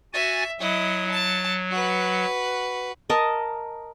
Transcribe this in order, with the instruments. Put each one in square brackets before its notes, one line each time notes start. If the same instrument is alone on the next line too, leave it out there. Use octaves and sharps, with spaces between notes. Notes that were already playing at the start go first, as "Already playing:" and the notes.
[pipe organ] F#4 G#5 A6 [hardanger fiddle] E5
[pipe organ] F#3 [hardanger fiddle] E4 D#5
[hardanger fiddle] A5
F#4 B4
[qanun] A#4 D#5 A5